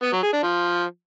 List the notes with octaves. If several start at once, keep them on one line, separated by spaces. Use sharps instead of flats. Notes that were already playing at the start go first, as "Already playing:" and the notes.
B3
F#3
G#4
D4
F3